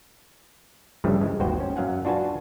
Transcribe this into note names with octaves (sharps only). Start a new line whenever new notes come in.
G2 C#3 E3 F3 G3 A3
G#3
G#1 D#2 F#4 B4 C5 G5
C#4
F#2 F#3 F5 F#5 G#5
D4 F4 F#4 B4 G#5 A5